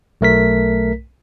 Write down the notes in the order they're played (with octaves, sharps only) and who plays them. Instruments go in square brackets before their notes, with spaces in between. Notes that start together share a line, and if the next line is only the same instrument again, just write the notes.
[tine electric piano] B1 A3 A#4 B6